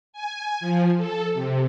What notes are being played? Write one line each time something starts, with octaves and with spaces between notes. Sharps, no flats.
G#5
F3
A4
C3